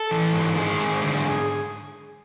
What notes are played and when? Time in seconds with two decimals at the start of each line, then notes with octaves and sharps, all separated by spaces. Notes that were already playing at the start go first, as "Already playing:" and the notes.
Already playing: A4
0.11 E3
0.33 G#2
0.56 D#3 G#4
0.79 G#2
1.01 D3